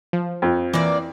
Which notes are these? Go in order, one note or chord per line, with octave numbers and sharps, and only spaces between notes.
F3
F2
E3 A#3 D4 D5